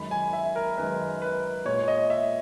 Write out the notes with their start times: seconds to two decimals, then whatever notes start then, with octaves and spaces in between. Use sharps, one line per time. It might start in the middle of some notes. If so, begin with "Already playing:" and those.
Already playing: F#2 D#3 G#3 B5
0.11 G#5
0.33 E5
0.56 A#4
0.77 F#2 D#3 G#3 B4
1.22 B4
1.65 A#2 G#3 C#5
1.88 D#5
2.10 E5